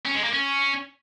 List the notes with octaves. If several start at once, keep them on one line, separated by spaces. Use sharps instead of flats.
C#4
G#3
A#3
C#4